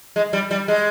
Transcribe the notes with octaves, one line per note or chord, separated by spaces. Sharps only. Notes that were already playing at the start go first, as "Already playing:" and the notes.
G#3
G3
G3
G#3